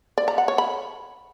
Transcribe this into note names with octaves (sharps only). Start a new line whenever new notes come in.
D5
A#5
F#5
C#5
B5